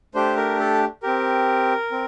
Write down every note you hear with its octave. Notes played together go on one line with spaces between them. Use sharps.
A3 D4 G4 C5
A#4
A4
C4 G4 A#4
C4